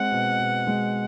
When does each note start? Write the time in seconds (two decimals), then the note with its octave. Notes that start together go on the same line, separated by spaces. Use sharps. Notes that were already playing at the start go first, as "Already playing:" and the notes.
Already playing: G#3 C4 F#5
0.11 B2
0.39 B2
0.67 G#3